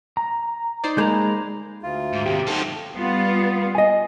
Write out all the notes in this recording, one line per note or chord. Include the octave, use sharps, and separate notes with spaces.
A#5
D#4 C5 D5
G#3 A#3 A#5 B5 G6
D2 F4
G#2
D#2 C3 G4
F#3 D#4 A4 C5
G3 B3 F4
D#5 G#5